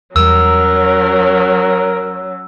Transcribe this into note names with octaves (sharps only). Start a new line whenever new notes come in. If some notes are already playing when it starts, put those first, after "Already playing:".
E2 F#3 G3 C#4 A#4 E6